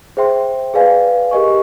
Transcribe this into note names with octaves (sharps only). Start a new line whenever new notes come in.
G#4 C5 E5 G5 C6
G#4 B4 D5 F5 G#5
G4 A#4 D#5 G#5 C#6